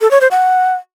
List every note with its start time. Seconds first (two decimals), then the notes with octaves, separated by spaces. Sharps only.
0.01 A4
0.11 C#5
0.21 C5
0.31 F#5